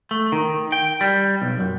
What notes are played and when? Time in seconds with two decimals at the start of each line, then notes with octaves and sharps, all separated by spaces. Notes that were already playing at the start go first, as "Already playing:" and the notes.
0.11 A3
0.32 D#3
0.72 G5
1.01 G3
1.42 B1
1.60 F#2